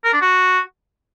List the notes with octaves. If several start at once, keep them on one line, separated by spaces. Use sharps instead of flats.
A#4
D4
F#4